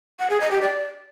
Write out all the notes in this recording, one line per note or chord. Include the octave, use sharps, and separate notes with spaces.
F#5
G#4
D#5
G4
D5